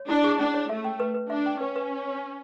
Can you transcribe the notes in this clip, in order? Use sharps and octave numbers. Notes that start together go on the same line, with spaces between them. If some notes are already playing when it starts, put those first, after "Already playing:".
Already playing: C#5
D4 E4
G#4
C#4 D4
C#5
A3 E5
G5
B4
B4
D4 E5
G5
C#4 B4
B4